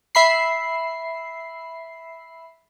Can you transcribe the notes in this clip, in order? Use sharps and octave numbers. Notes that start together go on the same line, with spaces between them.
E5 B5 C7